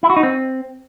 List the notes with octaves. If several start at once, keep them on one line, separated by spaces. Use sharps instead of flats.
E4
F#4
D#4
C4